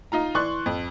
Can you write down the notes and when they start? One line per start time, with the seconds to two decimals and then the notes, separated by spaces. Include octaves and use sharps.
0.12 D#4 F4 A#5
0.35 E3 D5 C6 C#6 F#6
0.66 F2